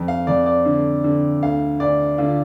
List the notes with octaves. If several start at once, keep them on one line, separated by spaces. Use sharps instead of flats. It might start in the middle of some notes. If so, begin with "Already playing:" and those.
Already playing: F2
F5
F2 D5
D5
D3
D3
D2 F5
D2 D5
D3 F4